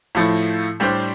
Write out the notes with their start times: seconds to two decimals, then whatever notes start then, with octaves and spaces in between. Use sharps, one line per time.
0.15 A2 F3 A3 E4
0.80 A2 G3 D4 G4 C5